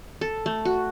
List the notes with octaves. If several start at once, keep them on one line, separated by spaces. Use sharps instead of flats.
A4
A3
F#4